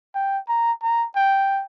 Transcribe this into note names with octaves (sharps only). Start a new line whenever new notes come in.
G5
A#5
A#5
G5